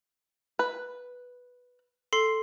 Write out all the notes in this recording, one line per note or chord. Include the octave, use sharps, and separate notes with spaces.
B4
A4 C6 C7